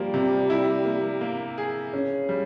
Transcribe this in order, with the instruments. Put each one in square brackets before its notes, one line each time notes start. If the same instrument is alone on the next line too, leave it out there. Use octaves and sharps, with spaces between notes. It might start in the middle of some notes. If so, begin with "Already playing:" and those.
Already playing: [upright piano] F3 A#3 [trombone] G3
[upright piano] C3
E4
A#3
A#3
G#4
[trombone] C#3 [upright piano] C#4
[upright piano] G3